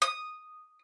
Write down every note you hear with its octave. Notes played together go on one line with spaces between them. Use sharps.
D#6